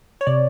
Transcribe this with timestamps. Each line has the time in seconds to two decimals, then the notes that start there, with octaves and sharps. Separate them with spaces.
0.21 C#5
0.27 C3 D5